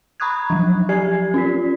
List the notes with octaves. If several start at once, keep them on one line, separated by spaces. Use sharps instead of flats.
A#5 B5 C#6 D#6 F#6 G#6
F3 F#3
G4 D5 G#5 G#6 C7
C#4 F4 B6